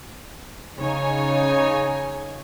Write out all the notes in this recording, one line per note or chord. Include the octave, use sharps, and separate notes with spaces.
C#3 D#4 C#5 G#5